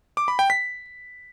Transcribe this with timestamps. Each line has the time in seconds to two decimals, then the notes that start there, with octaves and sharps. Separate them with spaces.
0.17 D6
0.28 B5
0.39 G5
0.50 B6